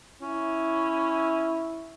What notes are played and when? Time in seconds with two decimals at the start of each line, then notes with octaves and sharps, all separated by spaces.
0.22 C#4 E4